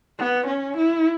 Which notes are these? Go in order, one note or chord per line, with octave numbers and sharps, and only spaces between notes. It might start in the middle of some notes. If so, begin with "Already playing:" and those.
B3
C#4
E4